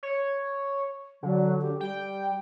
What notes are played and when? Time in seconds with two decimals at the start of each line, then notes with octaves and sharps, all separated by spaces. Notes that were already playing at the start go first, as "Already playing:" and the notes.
0.03 C#5
1.23 D3 F#3
1.62 G4
1.81 G3 G5